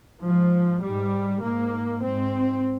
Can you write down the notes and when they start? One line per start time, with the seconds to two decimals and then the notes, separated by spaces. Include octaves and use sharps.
0.23 G#2 F3
0.82 G#2 G3
1.41 G#2 A#3
2.02 G#2 C4